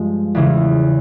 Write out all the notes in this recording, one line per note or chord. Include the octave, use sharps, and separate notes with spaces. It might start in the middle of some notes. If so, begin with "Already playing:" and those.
Already playing: G2 F3 G#3
E2 C#3 E3